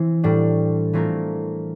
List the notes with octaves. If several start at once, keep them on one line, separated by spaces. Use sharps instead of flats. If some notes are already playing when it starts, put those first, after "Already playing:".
Already playing: E3 C4
A2 G3 D4
E3 A3 C4 F4 A#4